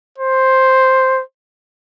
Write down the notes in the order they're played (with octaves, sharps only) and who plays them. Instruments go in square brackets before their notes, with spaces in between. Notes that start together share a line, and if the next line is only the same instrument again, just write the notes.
[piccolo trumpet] C5